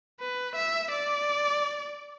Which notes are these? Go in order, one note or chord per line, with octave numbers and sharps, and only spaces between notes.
B4
E5
D5